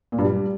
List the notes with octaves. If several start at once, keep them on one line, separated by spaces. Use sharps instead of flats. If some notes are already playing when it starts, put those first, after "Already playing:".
A#2
G2
G3